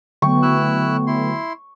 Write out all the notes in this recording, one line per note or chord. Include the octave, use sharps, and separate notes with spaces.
D3 F#3 A3 B3 G5 C#6
E4 E6 F#6
E4 C6